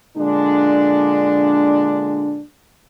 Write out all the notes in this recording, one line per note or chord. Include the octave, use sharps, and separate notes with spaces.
A#2 D3 G#3 D4